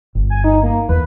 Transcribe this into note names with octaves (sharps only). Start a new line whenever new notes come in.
G1
G#5
D#4
A#3
E2 B4